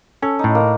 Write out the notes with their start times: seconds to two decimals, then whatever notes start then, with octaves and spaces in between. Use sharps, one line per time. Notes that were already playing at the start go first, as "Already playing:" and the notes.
0.22 C#4 A4
0.39 A2 D#4
0.55 A#3